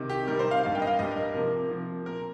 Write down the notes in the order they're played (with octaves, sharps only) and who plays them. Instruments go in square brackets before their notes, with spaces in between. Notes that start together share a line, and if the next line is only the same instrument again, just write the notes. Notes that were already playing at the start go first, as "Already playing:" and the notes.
Already playing: [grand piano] C3 D#3
G4
C3 D#3 G3 A#4
C5
F5
G2 G3 A#3 F5
G5
D#5
F5
G2 G3 A#3 D#5
A#4
A#4
C3 F3 A#3
C3 F3 A#3
A#2 A#3 A#4